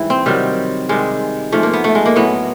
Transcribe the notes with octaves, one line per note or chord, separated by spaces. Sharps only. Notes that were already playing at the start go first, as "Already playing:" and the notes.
Already playing: G#2 E3 G3 E4
C4
C3 D#3 F#3 G3
C3 D#3 G3 G#3
G#2 F3 A3
A#3
B3
A3
G#3
A#3
A2 F#3 B3